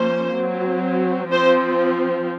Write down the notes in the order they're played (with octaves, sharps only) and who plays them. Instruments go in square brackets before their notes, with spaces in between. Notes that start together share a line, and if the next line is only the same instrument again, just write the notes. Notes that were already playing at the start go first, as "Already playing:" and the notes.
Already playing: [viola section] F3 A#3 C#4 C5
F#3 C4
F3 C4 C5